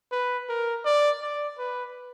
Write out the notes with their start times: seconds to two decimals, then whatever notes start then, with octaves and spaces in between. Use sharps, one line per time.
0.12 B4
0.49 A#4
0.85 D5
1.22 D5
1.58 B4